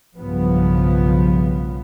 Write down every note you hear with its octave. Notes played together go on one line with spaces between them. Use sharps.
B1 G2 C#3 F3 B3